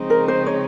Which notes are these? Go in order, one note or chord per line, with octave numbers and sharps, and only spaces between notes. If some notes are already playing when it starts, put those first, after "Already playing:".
Already playing: C#3 F3 G#3 C4 D#4
A#4
C5
C#5